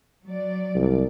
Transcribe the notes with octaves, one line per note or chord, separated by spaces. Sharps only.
F#3 D5
C2